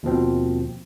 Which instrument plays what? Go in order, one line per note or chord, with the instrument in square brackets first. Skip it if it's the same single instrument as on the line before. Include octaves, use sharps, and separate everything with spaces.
[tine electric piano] D#2 B2 F3 C4